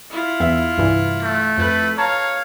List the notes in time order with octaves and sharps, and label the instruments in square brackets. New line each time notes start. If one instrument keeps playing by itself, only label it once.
[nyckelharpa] E4 F4
[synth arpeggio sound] E2 E5
C2 G2 E3
[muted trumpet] A3
[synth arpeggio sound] F2 F#6 [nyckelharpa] A4 B4
[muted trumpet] C#5 [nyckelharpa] F5 [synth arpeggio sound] A5 A#5